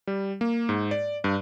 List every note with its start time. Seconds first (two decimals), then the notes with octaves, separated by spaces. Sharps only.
0.07 G3
0.41 A#3
0.69 G#2
0.91 D5
1.24 G2